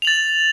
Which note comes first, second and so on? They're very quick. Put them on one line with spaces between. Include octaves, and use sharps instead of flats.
F7 F#7 A6